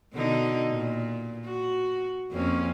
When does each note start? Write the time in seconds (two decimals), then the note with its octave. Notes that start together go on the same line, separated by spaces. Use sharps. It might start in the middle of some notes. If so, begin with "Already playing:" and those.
0.14 B2 D3 D#4
0.71 A#2
1.45 F#4
2.32 F2 A#3 C#4